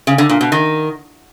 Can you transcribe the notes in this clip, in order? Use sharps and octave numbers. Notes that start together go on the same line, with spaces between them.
C#3
D3
A#2
B2
D#3